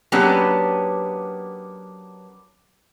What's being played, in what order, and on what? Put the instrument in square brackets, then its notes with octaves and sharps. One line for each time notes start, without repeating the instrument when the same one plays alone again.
[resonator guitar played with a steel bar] F#3 A#3 B3 C#4 D4 G4